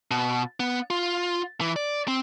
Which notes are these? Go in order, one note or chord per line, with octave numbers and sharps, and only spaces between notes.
B2
B3
F4
E3
D5
C4